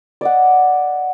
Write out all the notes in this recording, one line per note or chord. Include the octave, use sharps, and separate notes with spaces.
D5 D#5 F#5